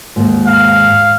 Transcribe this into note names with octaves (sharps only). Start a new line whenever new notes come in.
D#2 G#2
F5